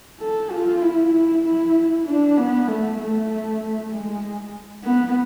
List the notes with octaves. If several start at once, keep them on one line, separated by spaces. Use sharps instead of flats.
A4
F4
E4
E4
D4
B3
A3
A3
G#3
B3